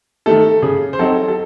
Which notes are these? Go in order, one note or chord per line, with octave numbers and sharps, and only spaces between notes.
D#3 A3 A4
C#3 G#4
C5
F#3 C4 D#4 A4
A4